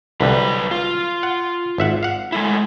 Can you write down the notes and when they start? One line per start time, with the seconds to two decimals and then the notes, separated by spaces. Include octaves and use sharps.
0.21 C2 D3 F#3 G3 B4
0.71 F4
1.23 F#5
1.78 G#1 E5 F#5
2.03 F5 F#5
2.32 G#3 A3 E4